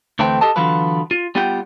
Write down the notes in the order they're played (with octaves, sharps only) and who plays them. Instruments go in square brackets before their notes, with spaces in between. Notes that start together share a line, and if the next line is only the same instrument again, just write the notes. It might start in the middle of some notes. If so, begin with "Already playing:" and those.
[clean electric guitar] D2 E3 A3 C4 G5
G4 A4 D#5 A5
D3 E3 F#3 B3 F4 B4
F4
G3 B3 F4 G4 F#5 G5